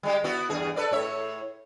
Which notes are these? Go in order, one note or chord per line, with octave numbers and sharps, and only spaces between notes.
G3 G#3 G4
B3 E4 F#4
E2 G2 G#4
A4 B4 D5
A2 C#5 E5